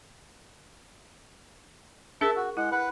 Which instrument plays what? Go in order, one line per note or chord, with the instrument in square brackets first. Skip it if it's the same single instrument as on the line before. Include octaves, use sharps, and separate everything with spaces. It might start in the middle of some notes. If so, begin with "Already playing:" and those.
[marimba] D4 G#4 A#4 [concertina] E5 A5
[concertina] F#4
[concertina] G#3 F#5 [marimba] E4
[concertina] B4 F#5